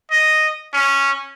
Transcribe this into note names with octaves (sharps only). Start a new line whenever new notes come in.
D#5
C#4